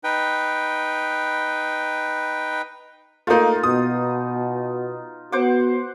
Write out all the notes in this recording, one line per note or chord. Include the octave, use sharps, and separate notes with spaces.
D#4 B4 G5
A3 A#3 D#4 F4
B2 D#6
B3 F#4 C5 F#5 D6